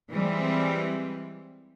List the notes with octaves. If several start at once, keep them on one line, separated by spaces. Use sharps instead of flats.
E3 G3 G#3 C4